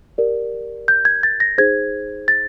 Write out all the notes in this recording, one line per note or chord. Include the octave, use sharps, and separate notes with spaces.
G4 A#4 D5
G6
G#6
A6
A#6
D#4 G#4 C5 G#6
A6